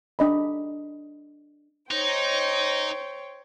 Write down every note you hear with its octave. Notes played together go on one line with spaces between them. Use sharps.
D4 D#5 B5
D#4 C5 C#5 G5